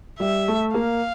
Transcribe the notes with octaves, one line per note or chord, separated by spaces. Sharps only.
G3 E5
A3
A#3 F5